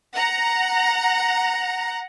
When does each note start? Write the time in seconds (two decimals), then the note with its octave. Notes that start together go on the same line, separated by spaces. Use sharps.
0.13 F#5 A#5